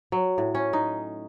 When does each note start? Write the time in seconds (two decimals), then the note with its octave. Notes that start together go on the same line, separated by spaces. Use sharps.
0.12 F#3
0.38 A2
0.55 C#4
0.73 D#4